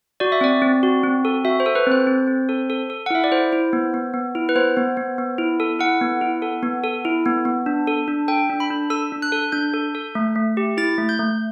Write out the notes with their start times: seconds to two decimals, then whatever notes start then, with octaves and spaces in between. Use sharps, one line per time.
0.20 F#4 D5
0.32 E5
0.41 C4 D5
0.62 C4
0.83 F#4
1.03 C4
1.25 A4
1.45 F#4 E5
1.60 C5
1.66 A4
1.75 B4
1.86 C4
1.92 C5
2.07 C4
2.27 C4
2.49 A4
2.70 A4
2.90 A4
3.06 F#5
3.10 E4 E5
3.24 D5
3.31 E4 C5
3.52 E4
3.73 B3
3.94 B3
4.14 B3
4.35 E4
4.49 B4
4.55 B3 C5
4.77 B3
4.97 B3
5.18 B3
5.38 E4
5.60 A4
5.79 E4 F#5
6.01 B3
6.21 E4
6.42 A4
6.63 B3
6.84 A4
7.05 E4
7.26 B3
7.45 B3
7.66 D4
7.87 A4
8.08 D4
8.28 A4 G5
8.50 D4
8.60 B5
8.70 D4
8.90 A4 E6
9.12 D4
9.22 F#6
9.32 A4
9.52 D4 G6
9.74 A4
9.95 A4
10.15 A3
10.36 A3
10.57 G4
10.77 E4 A6
10.98 A3
11.09 G6
11.19 A3